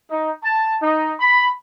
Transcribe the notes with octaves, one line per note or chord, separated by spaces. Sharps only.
D#4
A5
D#4
B5